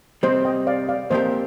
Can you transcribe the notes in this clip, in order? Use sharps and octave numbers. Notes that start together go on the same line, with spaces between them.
C3 G3 C4 C5 D#5
D#5 G5
D5 F5
D5 F5
A#2 F3 C4 G4 A#4 C5 D#5